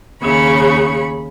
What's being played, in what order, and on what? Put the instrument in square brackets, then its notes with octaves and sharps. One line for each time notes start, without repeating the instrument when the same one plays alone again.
[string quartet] D#2 C#3 B5 C#6